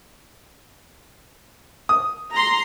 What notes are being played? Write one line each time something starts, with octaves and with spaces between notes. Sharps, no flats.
D#6
A#5 C6